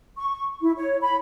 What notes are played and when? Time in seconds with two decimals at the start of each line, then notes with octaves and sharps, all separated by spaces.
0.17 C#6
0.62 E4
0.76 C#5
1.01 B5